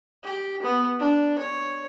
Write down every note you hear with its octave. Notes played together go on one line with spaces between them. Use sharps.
G4
B3
D4
C#5